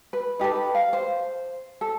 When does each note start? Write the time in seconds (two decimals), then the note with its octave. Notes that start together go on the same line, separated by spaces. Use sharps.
0.13 B4
0.39 D#4 G4 A4 B4
0.75 F5
0.93 C5
1.81 A4